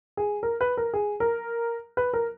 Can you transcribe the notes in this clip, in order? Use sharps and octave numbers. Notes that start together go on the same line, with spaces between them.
G#4
A#4
B4
A#4
G#4
A#4
B4
A#4